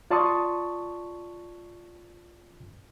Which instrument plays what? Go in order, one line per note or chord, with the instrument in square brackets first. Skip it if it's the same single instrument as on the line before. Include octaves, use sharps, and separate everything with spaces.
[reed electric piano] F4 D5 A5 C6 C#6 D#6